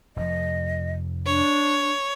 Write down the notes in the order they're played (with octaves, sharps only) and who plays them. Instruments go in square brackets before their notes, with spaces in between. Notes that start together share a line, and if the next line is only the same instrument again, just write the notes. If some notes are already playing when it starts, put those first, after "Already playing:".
[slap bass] F1 F2 F3 [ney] D#5
[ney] D4 [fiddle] C#5